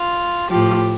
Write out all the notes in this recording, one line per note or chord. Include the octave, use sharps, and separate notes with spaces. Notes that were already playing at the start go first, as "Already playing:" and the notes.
Already playing: F4
A2 F3 G4